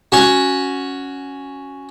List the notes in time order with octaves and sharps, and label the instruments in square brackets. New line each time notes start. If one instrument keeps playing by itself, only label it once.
[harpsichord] C#4 F#4